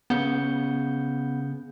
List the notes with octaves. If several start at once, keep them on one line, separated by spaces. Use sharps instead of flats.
C#3 B3 G6 C#7